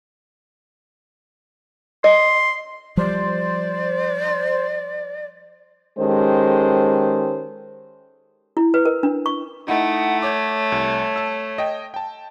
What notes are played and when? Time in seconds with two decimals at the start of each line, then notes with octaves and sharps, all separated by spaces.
2.04 D#5 C6
2.97 F3 G3 C5 D5
5.99 D#3 G#3 C#4 G4 A4 C5
8.57 E4
8.74 B4
8.85 A#4
9.03 D4
9.26 C#6
9.68 A3 D#4 E4 D#5 F#5
10.22 C#5 D6 G6
10.72 C2
11.16 A5 E6
11.58 D#5 G5
11.94 G5 A5